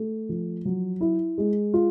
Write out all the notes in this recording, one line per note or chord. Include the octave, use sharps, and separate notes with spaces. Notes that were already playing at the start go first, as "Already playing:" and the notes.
Already playing: A3
F3
F#3
E4
G#3
F4